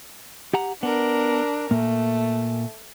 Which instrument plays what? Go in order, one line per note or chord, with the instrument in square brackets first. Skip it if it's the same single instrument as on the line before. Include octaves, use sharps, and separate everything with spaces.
[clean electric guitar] G4 F#5 A#5
[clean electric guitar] B3 [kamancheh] D4 A#4
[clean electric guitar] A#2 A#3 [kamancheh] A3